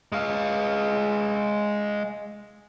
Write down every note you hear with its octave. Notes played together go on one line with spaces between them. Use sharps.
G#3 F5